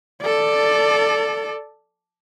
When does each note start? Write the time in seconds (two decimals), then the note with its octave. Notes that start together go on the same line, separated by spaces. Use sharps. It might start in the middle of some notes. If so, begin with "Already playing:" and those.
0.22 A4 D5